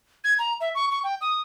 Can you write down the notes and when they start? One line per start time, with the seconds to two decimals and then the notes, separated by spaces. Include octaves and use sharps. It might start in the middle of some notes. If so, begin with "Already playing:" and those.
0.24 G#6
0.39 A#5
0.61 E5
0.75 C#6
0.91 C#6
1.04 G5
1.21 D#6